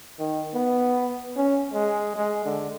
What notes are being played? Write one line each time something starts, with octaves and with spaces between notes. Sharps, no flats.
D#3
B3
C#4
G#3
G#3
D3